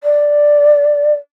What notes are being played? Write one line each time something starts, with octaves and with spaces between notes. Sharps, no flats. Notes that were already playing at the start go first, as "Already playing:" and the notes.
D5